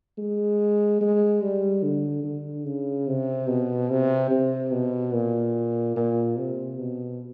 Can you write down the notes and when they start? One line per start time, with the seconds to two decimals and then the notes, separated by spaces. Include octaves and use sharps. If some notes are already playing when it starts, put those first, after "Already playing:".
0.18 G#3
1.01 G#3
1.42 G3
1.84 D3
2.24 D3
2.66 C#3
3.07 C3
3.48 B2
3.90 C3
4.31 C3
4.72 B2
5.14 A#2
5.96 A#2
6.37 C3
6.79 B2